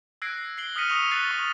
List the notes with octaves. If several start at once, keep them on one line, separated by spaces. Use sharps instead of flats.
E6 F#6 G#6 A#6 C7 D7
C7 D7 F#7 G7
D#6 F6 A#6 B6 C#7 D#7
C#6 D#6 E6 F7
F#6 A6 B6 C7 D#7 G7
C#6 A6